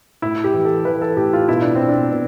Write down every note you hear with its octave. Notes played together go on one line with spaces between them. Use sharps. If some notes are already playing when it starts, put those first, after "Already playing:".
A2 E4
G4
E3
A4
E3 B4
A4
A2 G4
F4
B2 E4
D4
B2 C4
D4
B2